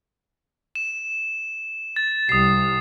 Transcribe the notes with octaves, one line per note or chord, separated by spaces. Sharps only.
E7
A6
C2 D#6 C7